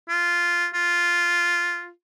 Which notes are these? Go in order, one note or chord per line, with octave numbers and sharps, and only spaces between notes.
F4
F4